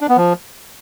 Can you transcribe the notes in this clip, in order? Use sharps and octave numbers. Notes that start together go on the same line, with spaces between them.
D4
B3
F3